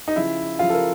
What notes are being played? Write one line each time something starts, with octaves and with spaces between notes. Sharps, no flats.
D#4
C#3 F3 E4
C#3 F3 F4
A4
A#4